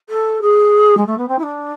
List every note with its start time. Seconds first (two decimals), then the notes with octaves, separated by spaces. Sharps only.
0.09 A4
0.41 G#4
0.97 G#3
1.06 A3
1.17 B3
1.28 C4
1.38 E4
1.43 D4